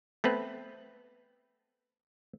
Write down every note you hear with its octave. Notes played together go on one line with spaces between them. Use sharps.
A3 B3 C4 B4